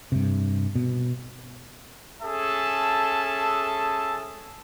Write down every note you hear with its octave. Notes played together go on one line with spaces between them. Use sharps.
G2 C3
B2
C#4 G#4 A4 E5 A5